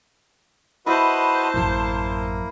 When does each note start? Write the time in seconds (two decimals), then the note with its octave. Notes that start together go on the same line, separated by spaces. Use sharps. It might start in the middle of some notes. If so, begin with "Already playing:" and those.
0.86 E4 F#4 B4 C5 D#5 A5
1.54 A1 F#2 A#3